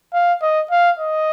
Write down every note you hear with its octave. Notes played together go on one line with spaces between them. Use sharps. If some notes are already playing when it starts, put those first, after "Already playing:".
F5
D#5
F5
D#5